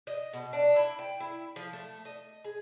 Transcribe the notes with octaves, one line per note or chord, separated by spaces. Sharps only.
D#5
B2
D4
E4
G5
E4
F3
A3
D#5
G#4